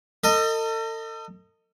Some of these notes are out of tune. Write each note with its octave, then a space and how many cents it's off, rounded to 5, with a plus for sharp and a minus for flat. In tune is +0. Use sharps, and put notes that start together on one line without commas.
A4 +40 D#5 +0